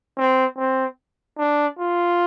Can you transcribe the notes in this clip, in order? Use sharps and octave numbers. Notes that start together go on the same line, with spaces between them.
C4
C4
D4
F4